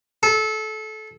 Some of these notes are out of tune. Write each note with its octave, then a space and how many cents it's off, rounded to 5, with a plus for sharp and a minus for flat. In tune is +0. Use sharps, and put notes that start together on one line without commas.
A4 -25